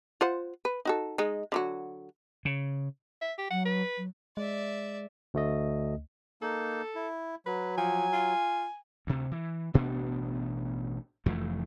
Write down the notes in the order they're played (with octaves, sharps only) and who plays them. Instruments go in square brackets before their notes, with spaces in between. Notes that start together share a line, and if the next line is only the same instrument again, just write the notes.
[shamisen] F4 C5 F#5
B4
D#4 F#4 A4
G#3 D#4
D3 F#3 F#4
[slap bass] C#3
[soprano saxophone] E5
G4
[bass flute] F#3 [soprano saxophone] F#5
[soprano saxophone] B4
[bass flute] F#3
[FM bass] G#3 [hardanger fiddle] D5 E5
[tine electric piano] D2 A3 D#5
[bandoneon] A#3 D#4 [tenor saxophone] A4
[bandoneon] E4
[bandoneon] F#3 [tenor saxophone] B4
[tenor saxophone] F3 [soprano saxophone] G#5
[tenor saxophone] F4
[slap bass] D2 C3
E3
A1 B2 B3 D4
F1 F2 E3 A3